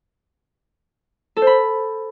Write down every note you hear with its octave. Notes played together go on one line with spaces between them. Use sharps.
A4
C5
B5